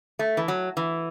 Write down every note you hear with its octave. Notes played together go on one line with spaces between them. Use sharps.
A3
E3
F#3
E3